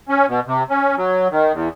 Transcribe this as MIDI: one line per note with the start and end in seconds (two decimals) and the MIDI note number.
0.09 0.26 61
0.29 0.40 47
0.47 0.63 48
0.70 0.95 61
0.98 1.28 54
1.31 1.52 51
1.53 1.69 40